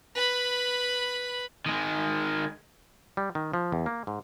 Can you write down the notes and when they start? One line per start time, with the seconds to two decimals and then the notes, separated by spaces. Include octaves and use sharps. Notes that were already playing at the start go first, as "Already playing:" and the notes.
0.15 B4 B5
1.66 D#3 G#3
3.17 G3
3.35 D#3
3.54 F3
3.72 E2
3.86 A#3
4.07 G#2